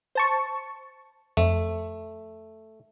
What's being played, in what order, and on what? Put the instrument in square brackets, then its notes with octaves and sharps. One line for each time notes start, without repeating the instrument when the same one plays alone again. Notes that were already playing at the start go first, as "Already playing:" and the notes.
[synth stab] C5 A5 C#6
[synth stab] F2 [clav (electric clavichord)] A3